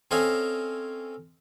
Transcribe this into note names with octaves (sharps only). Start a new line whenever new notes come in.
C4 C#4 A4 D#5 F5 G#5